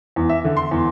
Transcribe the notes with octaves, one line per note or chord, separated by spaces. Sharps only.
E2
E5
D3
C6
E2